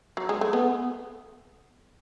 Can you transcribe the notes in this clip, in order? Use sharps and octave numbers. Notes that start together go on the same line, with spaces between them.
F#3
G#3
A3
B3